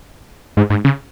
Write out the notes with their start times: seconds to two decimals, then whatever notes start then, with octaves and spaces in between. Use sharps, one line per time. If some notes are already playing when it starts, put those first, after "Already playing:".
0.57 G#2
0.70 G#2
0.84 C#3